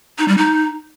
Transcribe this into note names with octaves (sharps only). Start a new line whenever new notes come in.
D#4
G3
D#4